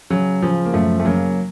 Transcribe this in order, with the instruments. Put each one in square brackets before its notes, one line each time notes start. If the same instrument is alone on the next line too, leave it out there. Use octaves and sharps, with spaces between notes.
[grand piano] C#3 F#3
C#3 F3
A#3
F#2 F3 A3
A3
C#3 F#3 A#3